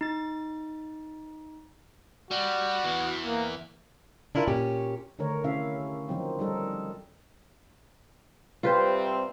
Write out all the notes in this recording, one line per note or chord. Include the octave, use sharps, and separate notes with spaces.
D#4 A6
G3 F#4
E2 E3
A#3
D4 E4 F4 A#4
A#2 C#4 G4 C#5
D3 D#3 A3 A#4 C#5
C3 C#4 E4 E5 F5
D#3 F3 F#3 C4 D#4
G3 D#4 A4 A#4
C3 G3 C4 F4 B4 C5